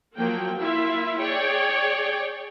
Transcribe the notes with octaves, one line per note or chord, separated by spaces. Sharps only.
F3 F#3 A#3 G5
A#3 E4 F4 E5
G#4 C#5 D5 G5